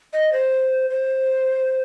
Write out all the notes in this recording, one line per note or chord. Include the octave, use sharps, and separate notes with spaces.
D#5
C5
C5